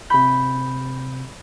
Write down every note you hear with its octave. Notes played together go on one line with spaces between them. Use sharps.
C3 B5 G6